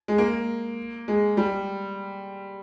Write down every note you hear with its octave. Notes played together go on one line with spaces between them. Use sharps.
G#3
A#3
G#3
G3